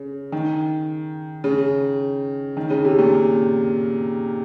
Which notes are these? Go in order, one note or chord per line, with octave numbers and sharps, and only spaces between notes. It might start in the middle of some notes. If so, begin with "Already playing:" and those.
Already playing: C#3
D#3
C#3
D#3
C#3
C3
A#2